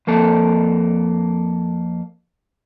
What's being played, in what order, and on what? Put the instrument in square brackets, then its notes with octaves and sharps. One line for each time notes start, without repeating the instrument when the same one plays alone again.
[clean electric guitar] F2 A#3 A4